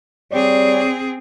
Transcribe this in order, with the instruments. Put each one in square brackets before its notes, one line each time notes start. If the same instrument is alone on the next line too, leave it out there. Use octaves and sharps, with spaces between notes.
[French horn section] G3 C#5 D5 [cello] C4 G#4